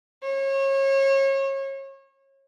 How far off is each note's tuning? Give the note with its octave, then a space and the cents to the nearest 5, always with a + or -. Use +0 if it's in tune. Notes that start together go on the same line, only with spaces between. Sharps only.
C#5 -30